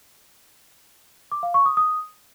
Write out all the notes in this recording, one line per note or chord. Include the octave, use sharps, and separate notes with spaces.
D6
F5
C#6
D#6
D#6